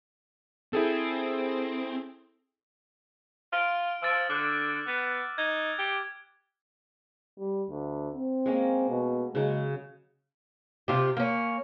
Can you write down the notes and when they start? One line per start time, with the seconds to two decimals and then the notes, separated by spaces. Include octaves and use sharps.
0.73 C4 E4 G#4 A4
3.53 F4 F6 D7
4.02 F3 E6 A6 D7
4.30 D3 D6 F6 F#6
4.88 B3
5.38 D#4 G#6
5.79 G4
7.39 G3
7.70 D2
8.14 C4
8.46 G#3 A#3 C#4
8.89 B2
9.35 C#3 F#3 G#3
10.88 C3 F4 G4
11.17 A#3 C#4